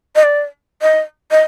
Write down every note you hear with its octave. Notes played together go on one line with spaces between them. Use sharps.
D#5
D5
D#5
D#5